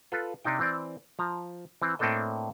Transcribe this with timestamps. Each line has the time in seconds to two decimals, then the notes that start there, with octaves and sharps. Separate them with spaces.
0.12 F4 A4 B4
0.44 C3 D4 D#4 G5
0.59 E3 C4 D5
1.19 F3 A#5
1.82 E3 C4
1.99 A2 A#3 C4 D4 A4 D#5